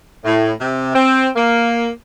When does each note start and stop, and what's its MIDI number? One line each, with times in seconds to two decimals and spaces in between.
0.25 0.52 45
0.59 0.89 48
0.95 1.28 60
1.35 1.88 58